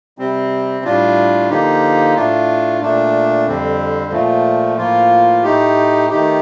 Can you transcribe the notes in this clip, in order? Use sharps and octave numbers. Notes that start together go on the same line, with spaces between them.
C3 G3 C4
A2 G3 D4 F4
D3 F3 A#3 D#4 G4
A2 A3 D4 F4
A#2 A3 D4
F2 D3 G3 C4
A#2 F3 A3
A2 F3 A#3 F4
A2 A3 D#4 G4
D#3 A3 D#4 G4